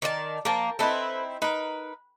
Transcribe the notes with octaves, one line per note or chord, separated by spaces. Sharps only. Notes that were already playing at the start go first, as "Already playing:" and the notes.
D#3 D5 A5
F3 A#3 A#4 G5 A5
C4 D#4 E4 A4 B4 C5
D#4 A#4 B4